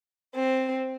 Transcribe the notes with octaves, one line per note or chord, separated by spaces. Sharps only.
C4